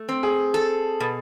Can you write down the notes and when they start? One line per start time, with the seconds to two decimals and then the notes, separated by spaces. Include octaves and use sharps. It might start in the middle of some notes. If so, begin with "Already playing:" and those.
Already playing: A3
0.09 C4
0.23 G#4
0.54 A4
1.00 B2